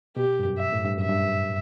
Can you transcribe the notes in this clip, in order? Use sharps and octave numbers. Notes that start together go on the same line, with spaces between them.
B2 G4
G2
F#2
E5
A2
G2
F#2 E5
G2